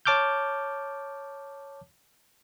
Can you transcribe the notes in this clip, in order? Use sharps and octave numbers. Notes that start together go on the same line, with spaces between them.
C#5 A5 D6 F6 G6